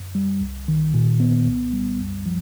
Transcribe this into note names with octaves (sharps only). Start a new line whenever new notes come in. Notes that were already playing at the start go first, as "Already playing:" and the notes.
Already playing: F#2
G3
C2
D#3
A#2
B3
C2
G3
F#2
F3